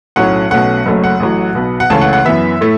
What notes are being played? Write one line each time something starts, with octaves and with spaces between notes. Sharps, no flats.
B1 A2 F#3 C#4 F#5
B1 B2 A3 C#4 F#5
F#1 F#2 F#3 A3 C#4
F#5
A1 A2 F#3
B1 B2 B3
F#5
C#2 C#3 E3 A3 C#4 A5
F#5
F#5
F#2 E3 B3 E5
A2 A3